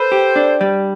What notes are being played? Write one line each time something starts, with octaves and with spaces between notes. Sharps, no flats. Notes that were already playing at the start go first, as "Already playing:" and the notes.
Already playing: A4 B4 C5
G4
D4
G3